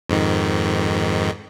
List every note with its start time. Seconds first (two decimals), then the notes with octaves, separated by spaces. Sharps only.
0.09 F2 G#2 D#3